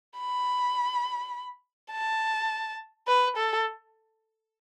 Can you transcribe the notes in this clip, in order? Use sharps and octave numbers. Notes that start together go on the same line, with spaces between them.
B5
A5
B4
A4